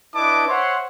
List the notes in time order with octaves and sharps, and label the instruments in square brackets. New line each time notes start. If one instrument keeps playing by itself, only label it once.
[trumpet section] D4 E4 B4 D#5 A5 D6
C5 C#5 E5 F#5 C6